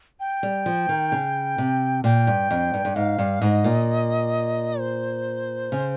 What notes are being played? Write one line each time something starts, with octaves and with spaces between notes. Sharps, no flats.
G5
G3
F3
D#3
C#3
C3
A#2 G5
G2
F2
G2
G2
G#2 F5
G2
G#2 D#5
A#2
C5
C#3